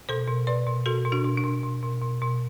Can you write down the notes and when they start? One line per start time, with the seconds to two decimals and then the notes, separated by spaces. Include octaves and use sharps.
0.09 B2 A4 C5
0.28 B2
0.47 B2 B4 D5
0.67 B2
0.86 B2 F#4 A4
1.05 B2
1.12 D4 F#4
1.24 B2
1.38 D4
1.44 B2
1.64 B2
1.83 B2
2.01 B2
2.22 B2